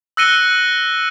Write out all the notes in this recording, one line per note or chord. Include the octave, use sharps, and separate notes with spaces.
E6 F#6 A#6 C#7 D#7 G7